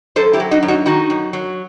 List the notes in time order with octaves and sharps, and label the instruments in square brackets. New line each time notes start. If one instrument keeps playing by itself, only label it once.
[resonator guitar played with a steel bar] F#2 A4 C5
E4 G4
F#3
D#4 F#4
F#2
D#4 F#4
D#3 D#4 F#4
F#2
F#3